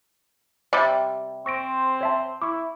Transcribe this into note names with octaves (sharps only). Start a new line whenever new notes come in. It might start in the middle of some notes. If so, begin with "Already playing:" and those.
C3 G3 D5 D6
C4 C5 C#6 A#6 D7
C#5 E5 A5
E4 C#6 D6